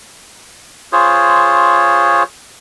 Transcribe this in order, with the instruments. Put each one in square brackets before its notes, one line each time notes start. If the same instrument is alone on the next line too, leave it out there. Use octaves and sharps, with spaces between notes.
[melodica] F4 G#4 C5 C#5